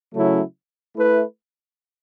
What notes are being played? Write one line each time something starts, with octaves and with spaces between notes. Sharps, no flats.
C#3 F#3 A3 C#4 E4
A3 E4 B4